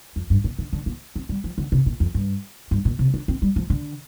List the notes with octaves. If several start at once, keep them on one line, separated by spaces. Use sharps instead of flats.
F2
G2
A#2
D3
D3
A#3
C4
G3
F3
D3
C3
A#2
F2
G2
G2
A#2
C3
D4
C4
G3
F3
D3